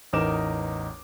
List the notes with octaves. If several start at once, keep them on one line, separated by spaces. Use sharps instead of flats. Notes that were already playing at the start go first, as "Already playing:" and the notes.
A1 E2 D#4 A#4 D6 E7